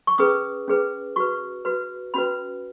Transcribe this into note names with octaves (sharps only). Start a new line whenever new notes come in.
C#6
C#4 G#4 B4 D#6
C#4 G#4 B4
F#4 B4 C#6
F#4 B4
C#4 F#4 B4 B5